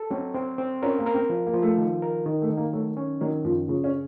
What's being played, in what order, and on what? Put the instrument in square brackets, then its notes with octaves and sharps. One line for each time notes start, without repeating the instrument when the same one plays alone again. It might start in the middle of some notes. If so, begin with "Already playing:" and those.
Already playing: [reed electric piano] A4
[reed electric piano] F#3 [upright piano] C4
[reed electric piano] C4
C4
[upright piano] C#4 [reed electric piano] A#4
[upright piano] A#3
[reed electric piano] A#4
[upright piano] C4
[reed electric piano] F3
[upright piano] A#3
[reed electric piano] F3
[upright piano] A3
[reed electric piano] D#3
A#4
D#3
[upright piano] A3
[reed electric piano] D#3
[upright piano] A#3
[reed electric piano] F#3 [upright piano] A3
[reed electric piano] C#4
[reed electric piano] D#3 [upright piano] F#3
[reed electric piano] F#2 [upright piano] F3
[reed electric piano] C#3 [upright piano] F3
[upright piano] C#4